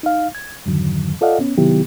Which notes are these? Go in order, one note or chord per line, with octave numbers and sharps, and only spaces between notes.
D#4 F5
G#6
F2 G#2 D3 D#3 F#3
F4 A4 D5 D#5 F5 F#5
B3 C#4
C3 D#3 F#3 B3 E4 G4